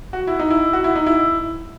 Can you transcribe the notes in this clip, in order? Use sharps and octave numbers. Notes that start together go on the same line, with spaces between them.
F#4
E4
D#4
E4
F#4
E4
D#4
E4